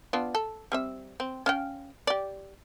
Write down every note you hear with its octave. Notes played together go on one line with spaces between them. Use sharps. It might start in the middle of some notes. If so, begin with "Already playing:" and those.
B3 D4 F4
A4
G3 C4 E5
C4
C#4 F5 G5
G4 D5